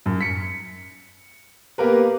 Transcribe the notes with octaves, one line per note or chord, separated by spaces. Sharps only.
F#2
B6 C#7
A#3 B3 G4 A#4 B4